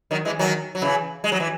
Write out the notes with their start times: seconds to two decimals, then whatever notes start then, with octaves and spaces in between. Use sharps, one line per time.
0.11 D#3 F#3
0.25 E3 G#3
0.39 D#3 F#3
0.75 F#3
0.82 C#3 E3
1.24 G#3
1.32 F#3
1.40 E3